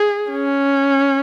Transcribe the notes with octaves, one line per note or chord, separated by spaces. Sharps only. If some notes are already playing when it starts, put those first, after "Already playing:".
Already playing: G#4
C#4